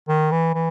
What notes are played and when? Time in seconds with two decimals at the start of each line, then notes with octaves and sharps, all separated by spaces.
0.09 D#3
0.32 E3
0.55 E3